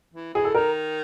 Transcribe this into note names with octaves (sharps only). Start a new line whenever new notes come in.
E3
E3 G#4
A4
D#3 A#4